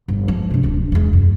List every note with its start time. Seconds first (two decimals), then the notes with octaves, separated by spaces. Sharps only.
0.08 G1
0.28 F3 G#3
0.50 C3 D4
0.63 D1 D4
0.92 E2 G#3
1.13 F#2